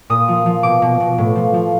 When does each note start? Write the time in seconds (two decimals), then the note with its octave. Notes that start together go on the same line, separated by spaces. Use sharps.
0.10 A#2 D#6
0.28 F3
0.46 F3
0.63 B2 D6
0.82 B2
1.00 B2
1.18 A2
1.35 F3
1.54 F3